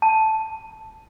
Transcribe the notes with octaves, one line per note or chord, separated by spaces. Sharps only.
A5